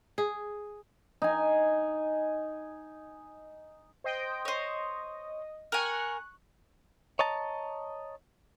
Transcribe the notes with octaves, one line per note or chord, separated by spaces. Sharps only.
G#4
D#4 G#5
C5 D#5 G5
C5 C#5 D#5
A#4 G#5 C#6 F#6
C#5 D#5 A5 A#5